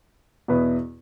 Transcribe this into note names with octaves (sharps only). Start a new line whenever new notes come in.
E2 B2 B3 E4 B4